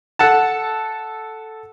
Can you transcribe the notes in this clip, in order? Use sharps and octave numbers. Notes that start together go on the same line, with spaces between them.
A4 F#5 A5